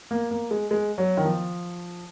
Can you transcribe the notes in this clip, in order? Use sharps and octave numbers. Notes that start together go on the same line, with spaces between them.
A#3
A#3
G#3
G#3
F#3
D#3
F3